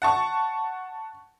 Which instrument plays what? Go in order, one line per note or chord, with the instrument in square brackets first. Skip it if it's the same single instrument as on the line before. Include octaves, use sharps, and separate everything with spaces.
[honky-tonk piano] F#5 A5 C#6